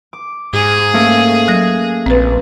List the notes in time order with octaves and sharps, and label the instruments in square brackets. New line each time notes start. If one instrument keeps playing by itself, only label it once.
[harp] D6
[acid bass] G#2 [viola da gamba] G#4
[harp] A3 A#3 C#4
[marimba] F#3 A#6
[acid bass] A#1 [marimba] C4 B4